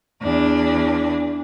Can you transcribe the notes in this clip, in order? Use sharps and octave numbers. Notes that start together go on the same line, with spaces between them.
E2 D4